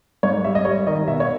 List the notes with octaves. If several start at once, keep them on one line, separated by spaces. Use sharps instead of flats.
G#2 C#5
G3 E5
D#5
G3 C#5
D#3 D#5
B2 E5
C#5